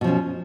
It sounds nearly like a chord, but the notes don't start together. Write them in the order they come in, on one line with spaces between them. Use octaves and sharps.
B2 F3 C#4